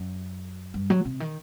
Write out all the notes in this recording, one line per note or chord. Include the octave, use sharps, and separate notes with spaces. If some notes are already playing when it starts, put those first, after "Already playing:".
Already playing: F#2
G2
F#3
C3
D#3